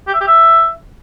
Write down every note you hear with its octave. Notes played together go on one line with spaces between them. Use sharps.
G4
E5
G4
E5